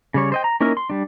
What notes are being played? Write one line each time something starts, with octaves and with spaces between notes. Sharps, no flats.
C#3 G3 C#5
C5 D#5 G5
A#5
A#3 C#4 D#4 E4 A#4
C6
G3 D4